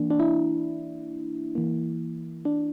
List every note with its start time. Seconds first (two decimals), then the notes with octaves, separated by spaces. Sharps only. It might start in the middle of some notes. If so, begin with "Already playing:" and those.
Already playing: E3 A#3 D4
0.10 D4
0.20 E4
1.55 E3 A#3
2.45 D4